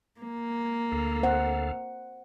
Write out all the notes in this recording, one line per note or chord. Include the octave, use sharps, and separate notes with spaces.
A#3
D2 A4 F5
C5 F#5